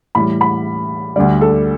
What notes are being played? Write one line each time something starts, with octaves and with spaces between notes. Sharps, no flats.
A2 E3 G3 B5
B5
D2 D3 G3 D5
A4